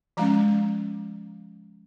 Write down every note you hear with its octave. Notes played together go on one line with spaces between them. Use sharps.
F3 G#3 C#4 A#5